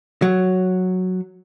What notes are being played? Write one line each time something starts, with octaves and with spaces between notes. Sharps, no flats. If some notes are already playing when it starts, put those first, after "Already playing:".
F#3